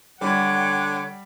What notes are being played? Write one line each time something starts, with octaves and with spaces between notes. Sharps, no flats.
D3 G3 C#5 F#5 G5